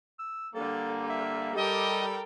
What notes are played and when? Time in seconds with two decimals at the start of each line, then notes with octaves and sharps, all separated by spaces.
0.19 E6
0.54 D3 G3 A#3 A4
1.10 E5
1.56 G3 G4 A4 A#4 D#5 G5